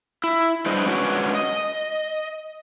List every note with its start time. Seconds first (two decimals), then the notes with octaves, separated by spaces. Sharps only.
0.24 E4
0.66 G3 D4 G#4 B4 C5 D#5
0.86 G#3 C#4 D4 F#4 B4 C#5
1.35 D#5